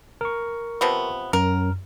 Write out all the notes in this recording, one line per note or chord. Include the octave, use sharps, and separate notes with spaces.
A#4 C#6
C3 F3 B3
F#2 A#4